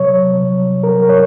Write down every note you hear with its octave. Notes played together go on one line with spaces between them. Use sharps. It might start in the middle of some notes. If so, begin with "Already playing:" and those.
Already playing: C3 F#3 C#5
C3 F#3
C3 F#3 A#4
C#5